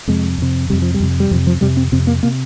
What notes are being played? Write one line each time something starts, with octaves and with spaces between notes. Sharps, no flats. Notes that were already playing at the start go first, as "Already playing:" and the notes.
F2 C3 G#3
F2 C3
F2 C3 G3
F3
G3
F2 C3
G3
F2 C3 F3
F3
F2 C3 G3
C4
F2 C3 C4
A#3
C3 A#3